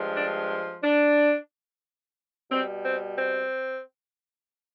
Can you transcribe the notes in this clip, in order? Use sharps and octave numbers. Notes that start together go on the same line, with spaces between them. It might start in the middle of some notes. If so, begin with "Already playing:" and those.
Already playing: G2 F3 G#3
D4
D4
B2 G3 C4
C4
C4